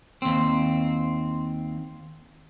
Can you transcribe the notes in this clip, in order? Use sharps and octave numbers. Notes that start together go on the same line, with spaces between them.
D#2 C4